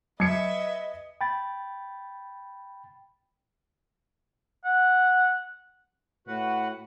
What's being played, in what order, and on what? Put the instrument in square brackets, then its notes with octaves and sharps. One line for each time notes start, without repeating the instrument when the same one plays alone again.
[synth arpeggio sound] F#3 [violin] B4 E5 [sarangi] D#5 [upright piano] G#6 C#7
[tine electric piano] G5 B5 A6
[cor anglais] F#5
[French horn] A2 [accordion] F#4 B4 F#5